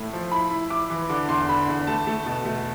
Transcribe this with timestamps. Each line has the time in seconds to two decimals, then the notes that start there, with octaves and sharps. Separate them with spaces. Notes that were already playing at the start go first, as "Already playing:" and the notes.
Already playing: A2 A3 E4
0.13 F3
0.32 E4 B5
0.51 E4
0.70 E4 D6
0.90 E3
1.09 D3 D6
1.28 E2 C6
1.49 D3 B5
1.68 E2
1.87 A3 A5
2.07 A3
2.26 B2
2.45 A3